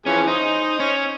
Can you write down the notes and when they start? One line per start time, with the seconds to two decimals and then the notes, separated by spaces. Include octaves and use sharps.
0.06 E3 F3 C#4 G#4
0.27 D#4 C5 D#5
0.80 C#4